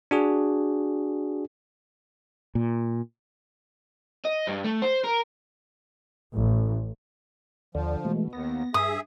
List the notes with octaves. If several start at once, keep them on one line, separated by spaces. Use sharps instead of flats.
D4 F#4 G#4
A#2
D#5
G2
A3
C5
A#4
A1
D#2 D3 F3 D5
B2 E3 G#3 A3
D#2 B3 A#6
G2 G#4 E5 D#6